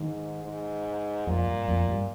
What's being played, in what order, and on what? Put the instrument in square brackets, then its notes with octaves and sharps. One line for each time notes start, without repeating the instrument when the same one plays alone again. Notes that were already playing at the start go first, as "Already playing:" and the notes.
Already playing: [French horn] G#2 [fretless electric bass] D#3
[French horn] G#2
[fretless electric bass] F2 [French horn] A#2
[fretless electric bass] G2
F2
G2